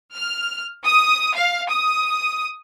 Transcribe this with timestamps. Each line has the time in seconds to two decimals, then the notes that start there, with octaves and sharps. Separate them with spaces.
0.14 F6
0.85 D#6
1.35 F5
1.69 D#6